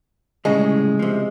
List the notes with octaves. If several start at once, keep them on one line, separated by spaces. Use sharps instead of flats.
C2 A2 C#3 G#3
C3 F3